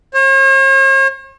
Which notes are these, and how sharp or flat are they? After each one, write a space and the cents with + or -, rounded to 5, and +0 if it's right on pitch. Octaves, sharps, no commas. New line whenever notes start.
C#5 -45